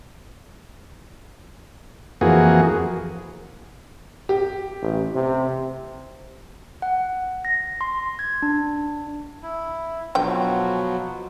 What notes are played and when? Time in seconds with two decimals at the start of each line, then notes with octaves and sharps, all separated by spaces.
2.21 F2 E3 A#3 F#4 G#4
4.29 G4
4.82 A1
5.15 C3
6.82 F#5
7.45 A#6
7.81 C6
8.19 G#6
8.42 D4
9.42 E4
10.15 B2 D3 F3 F#3 G5